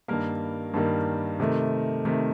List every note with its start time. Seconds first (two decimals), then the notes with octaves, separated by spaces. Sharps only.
0.08 G2 D#3 G3 A#3 A#4
0.74 G2 D#3 G3 A#3
1.40 C3 D#3 A3
2.05 C3 D#3 A3